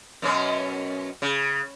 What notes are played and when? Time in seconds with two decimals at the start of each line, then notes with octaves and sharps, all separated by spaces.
0.22 F#2 B2 C#4
1.22 C#3